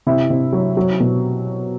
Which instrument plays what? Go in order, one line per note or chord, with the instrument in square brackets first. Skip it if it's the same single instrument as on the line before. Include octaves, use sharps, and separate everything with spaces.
[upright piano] C3 E4
C3
F#3
F#3
B2